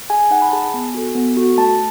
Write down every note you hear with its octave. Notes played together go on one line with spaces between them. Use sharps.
G#4 G#5
D#4 F#5
B5
G#4 A5
G#5
B3
F#4 A4
B3
F#4 A4
A3 A5